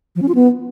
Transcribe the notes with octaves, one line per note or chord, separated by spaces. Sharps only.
F3
C#4
F4
B3